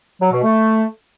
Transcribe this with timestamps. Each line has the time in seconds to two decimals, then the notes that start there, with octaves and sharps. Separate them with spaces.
0.21 F#3
0.32 B2
0.43 A3